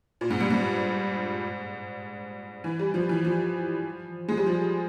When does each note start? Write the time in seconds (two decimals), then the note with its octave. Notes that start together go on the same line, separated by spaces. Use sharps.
0.21 A#2
0.31 G#2
0.41 G2
0.51 G#2
2.64 E3
2.79 G3
2.94 F3
3.09 E3
3.25 F3
4.29 G#3
4.37 G3
4.46 F3